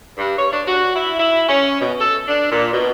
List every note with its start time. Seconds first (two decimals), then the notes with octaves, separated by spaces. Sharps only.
0.18 G2
0.39 C#5
0.53 D4
0.68 F#4
0.96 E4
1.19 E4
1.49 C#4
1.81 B2
2.01 A4
2.27 D4
2.52 A#2
2.73 B2